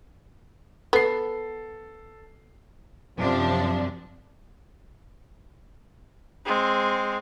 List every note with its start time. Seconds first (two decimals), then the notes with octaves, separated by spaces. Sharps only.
0.93 B3 A4 C7
3.17 F#2 C3 F3 D4
6.45 G#3 C4